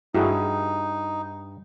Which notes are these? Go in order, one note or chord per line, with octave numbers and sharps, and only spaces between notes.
G2 D#4 E4 F#4 G#4